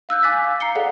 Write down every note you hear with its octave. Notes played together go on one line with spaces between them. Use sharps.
F5 E6 F#6 G6
G#5 D6 F#6 A6 B6
F5
A#5 C7 C#7 G7
G#4 A4 D5 F5 F#5